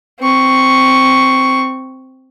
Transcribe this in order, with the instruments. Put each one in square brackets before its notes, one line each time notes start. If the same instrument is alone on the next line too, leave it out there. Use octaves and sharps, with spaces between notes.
[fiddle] C4 C#6